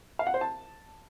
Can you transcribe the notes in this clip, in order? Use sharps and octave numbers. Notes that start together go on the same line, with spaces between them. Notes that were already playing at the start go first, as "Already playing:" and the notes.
F5
F#5
C5
A5